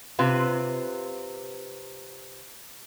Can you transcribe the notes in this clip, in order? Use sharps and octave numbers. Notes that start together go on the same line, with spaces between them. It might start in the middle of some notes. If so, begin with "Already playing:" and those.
C3 F4 B4